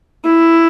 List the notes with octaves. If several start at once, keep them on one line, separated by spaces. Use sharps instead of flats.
E4